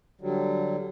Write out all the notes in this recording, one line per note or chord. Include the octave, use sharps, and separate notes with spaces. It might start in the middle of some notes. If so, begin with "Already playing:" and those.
D3 F#3 G3